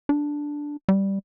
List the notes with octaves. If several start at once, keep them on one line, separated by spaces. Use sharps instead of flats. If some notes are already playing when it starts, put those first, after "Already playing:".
D4
G3